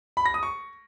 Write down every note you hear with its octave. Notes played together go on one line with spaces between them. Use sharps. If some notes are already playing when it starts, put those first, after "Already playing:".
B5
A#6
D#6
C#6